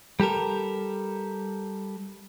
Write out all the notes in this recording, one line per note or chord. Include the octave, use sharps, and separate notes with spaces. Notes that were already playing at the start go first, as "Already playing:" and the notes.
G3 G4 A4 A#4